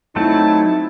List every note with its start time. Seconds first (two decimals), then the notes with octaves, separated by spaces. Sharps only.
0.16 F#3 A3 C4 D#4 E4 A5